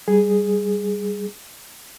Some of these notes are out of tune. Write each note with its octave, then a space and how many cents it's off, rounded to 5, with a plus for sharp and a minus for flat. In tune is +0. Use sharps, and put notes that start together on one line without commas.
G3 +0 G#4 +0